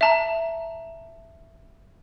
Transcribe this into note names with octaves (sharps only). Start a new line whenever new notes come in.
E5 A5 A#5